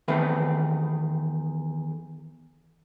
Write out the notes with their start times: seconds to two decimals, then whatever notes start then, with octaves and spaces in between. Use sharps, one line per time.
0.08 E2 D#3 A3 C4 B4